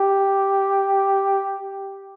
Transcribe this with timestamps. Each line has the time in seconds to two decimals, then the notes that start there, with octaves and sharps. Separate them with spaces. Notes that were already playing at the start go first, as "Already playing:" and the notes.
Already playing: G4